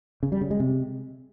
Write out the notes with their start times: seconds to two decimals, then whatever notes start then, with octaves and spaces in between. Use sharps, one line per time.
0.23 C#3
0.32 G3
0.41 C#3
0.50 G#3
0.60 C3